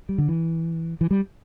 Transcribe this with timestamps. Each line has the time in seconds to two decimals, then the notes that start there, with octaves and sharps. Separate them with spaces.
0.09 G3
0.18 D3
0.28 E3
1.01 E3
1.11 G3